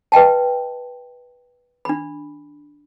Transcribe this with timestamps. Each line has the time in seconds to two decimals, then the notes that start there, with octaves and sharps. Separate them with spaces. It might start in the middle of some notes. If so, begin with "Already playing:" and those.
0.12 B4 D#5 G5 A5
1.85 D4 B5